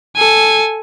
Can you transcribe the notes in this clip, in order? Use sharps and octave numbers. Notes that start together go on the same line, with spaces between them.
A4 G#5